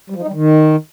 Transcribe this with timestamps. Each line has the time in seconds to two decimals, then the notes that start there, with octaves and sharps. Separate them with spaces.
0.10 G3
0.16 F3
0.22 D#4
0.28 G3
0.34 D#3